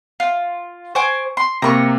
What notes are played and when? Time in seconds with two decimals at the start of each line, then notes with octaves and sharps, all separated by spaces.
0.20 F4
0.95 C5 G#5 C#6 D6
1.37 C6
1.62 C3 A#3 A#5 B5 C#6